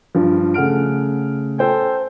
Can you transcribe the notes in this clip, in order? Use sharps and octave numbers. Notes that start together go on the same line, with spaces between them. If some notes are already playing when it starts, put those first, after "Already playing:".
G2 F3
C#3 A3 F#5 F6 D7
A4 C5 G5 G#5